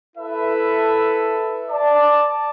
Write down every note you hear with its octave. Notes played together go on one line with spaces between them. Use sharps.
E4 A4 B4 E5
D5 A5